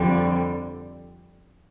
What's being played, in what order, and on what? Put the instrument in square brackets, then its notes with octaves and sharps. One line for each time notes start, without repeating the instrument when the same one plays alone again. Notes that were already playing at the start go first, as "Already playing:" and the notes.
Already playing: [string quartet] F2 D3 G3 C4